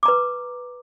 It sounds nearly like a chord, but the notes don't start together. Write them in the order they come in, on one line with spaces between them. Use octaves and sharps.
D6 A#5 B4